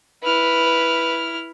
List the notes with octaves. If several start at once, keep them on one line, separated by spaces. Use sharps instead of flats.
E4 B4 F6